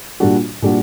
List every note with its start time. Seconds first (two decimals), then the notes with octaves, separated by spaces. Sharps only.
0.20 A#2 G3 D4 F#4
0.62 A#2 G3 D4 F#4